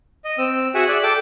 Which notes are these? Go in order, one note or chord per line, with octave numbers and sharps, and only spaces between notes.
D#5
C4 E6
F#4 G#4 E5 F#5 G#5
D5 E5 F#6
A4 G5 D6